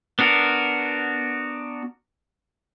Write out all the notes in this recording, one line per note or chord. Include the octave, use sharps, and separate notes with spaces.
B3 D4 F#4 A#4